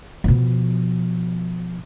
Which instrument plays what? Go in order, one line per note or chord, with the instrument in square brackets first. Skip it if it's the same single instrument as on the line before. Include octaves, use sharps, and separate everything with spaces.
[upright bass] B2 F3